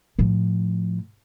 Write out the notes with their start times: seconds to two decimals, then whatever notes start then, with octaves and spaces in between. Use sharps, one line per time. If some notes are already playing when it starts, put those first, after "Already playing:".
0.19 A2 F3